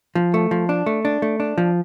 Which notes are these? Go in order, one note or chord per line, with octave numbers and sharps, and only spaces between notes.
F3
A3
F3
D4
A3
D4
A3
D4
F3